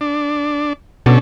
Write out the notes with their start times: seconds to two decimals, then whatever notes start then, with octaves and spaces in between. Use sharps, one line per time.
0.01 D4
1.06 B2 C#4 D4 A4